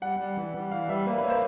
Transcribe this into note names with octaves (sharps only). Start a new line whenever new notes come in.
G3 F#5
G3
E3
G3
E3 F5
G3 E5
A#3 B4
B4
A#3 C#5
C5